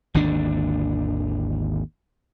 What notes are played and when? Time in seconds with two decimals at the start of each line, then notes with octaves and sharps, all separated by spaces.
0.14 G#1 D#2 D3 D4